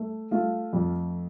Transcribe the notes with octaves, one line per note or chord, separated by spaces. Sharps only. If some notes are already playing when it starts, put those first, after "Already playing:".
Already playing: A3
A3 F4
F2